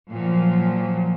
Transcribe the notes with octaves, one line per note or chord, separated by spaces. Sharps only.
A#2 F3 F#3